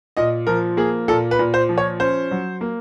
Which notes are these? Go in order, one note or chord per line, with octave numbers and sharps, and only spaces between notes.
A#2 D#5
F3 A#4
A#3 G#4
A#2 A4
B4
A#2
C5
F3
C#5
C#4 C5
F#3
A#3